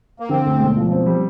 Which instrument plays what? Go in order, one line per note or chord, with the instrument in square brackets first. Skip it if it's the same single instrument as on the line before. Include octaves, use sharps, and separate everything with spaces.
[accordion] A#3
[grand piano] D3 [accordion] C4
[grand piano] D2
E1
F3
C4
G3